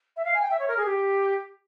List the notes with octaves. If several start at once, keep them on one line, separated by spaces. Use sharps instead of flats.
E5
F5
G#5
G5
E5
C#5
A#4
G#4
G4